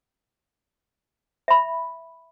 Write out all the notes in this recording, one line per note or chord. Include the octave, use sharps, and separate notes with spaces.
E5 B5